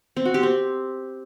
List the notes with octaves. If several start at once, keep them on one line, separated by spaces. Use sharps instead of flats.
C4
F#4
G4
C4